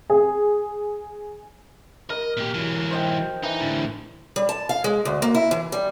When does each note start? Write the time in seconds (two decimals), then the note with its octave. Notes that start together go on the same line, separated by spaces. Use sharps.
0.10 G#4
2.10 A#4 D#5
2.37 A#2 G4
2.54 E3 F#3
2.91 C5 D#5 G5
3.43 E3 D#4
3.61 A2 D3
4.36 G3
4.49 A5
4.69 F5
4.84 G#3
5.05 D2
5.22 A#3
5.35 E4
5.51 E3
5.72 G3